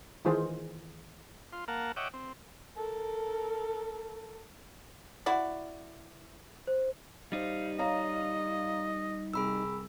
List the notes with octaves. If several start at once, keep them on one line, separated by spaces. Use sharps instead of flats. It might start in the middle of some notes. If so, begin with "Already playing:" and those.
D#3 E3 G#3 F4 G#4 C5
F4 C6
A#3 A#4 F5 F#5 A5
C#5 D#5 E5 F#5 G5 D6
C4
A4 A#4
E4 F#4 D5
C5
G3 D#4 G4 C5 F5
C#5 D#5 F5 A#5
C2 G#4 B5 E6